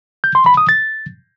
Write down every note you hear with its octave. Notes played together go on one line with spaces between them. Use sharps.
G6
C6
B5
D#6
A6